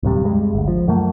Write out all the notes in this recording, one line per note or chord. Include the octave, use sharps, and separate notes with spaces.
D1 G2 C3 G3
G2 G#3
G1 D2
F3
F#2 F#3 A3 A#3